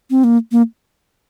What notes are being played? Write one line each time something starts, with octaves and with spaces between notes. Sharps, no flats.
C4
A#3
A#3